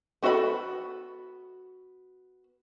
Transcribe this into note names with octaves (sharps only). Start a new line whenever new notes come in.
B3 F#4 A4 F5 B5